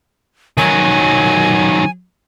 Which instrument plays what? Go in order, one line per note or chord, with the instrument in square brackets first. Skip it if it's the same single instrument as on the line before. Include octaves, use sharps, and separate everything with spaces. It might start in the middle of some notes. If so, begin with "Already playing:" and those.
[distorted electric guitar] D#3 F#3 [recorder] G#5